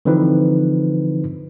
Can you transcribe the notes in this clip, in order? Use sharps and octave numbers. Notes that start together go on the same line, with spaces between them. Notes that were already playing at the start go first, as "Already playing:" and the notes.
D3 E3 F3 C4 D#4 B4